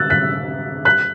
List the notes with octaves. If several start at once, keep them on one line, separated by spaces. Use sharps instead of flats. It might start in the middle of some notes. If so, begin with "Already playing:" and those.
Already playing: E6 F#6 A6
F#6 B6
F#6 B6